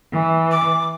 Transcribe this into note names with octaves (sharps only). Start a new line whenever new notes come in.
E3
D6